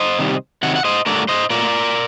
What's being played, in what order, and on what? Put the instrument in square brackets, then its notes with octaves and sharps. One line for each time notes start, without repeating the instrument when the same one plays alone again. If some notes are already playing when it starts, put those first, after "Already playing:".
Already playing: [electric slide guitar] C5 D#5
C3 D#3 G3
C3 D#3 F#3 F#5
F#5
C5 D#5
G2 D3 F#3 A3 A#4 D5
C5 D#5
A#2 F#3 A3 A#4 D5